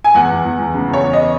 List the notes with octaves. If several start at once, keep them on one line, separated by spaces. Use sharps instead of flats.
G#5
E2 F#5
E2
E2
E2
C#3
E2 C#5
E2
D#5